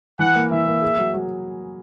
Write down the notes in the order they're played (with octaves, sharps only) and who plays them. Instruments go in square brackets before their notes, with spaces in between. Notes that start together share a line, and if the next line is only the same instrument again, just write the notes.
[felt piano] E3 [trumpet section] F#5
[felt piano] A#3
[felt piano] E3 [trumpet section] E5
[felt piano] A#3
G#4
F#3
F#3